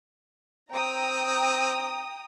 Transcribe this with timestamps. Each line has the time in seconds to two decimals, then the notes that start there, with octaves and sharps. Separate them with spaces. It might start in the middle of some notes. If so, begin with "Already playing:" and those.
0.72 C4 G5 A#5 D#6